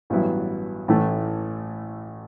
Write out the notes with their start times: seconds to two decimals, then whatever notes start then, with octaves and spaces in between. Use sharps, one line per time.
0.10 A1 G2 F#3 B3 E4
0.88 A1 A2 E3 A3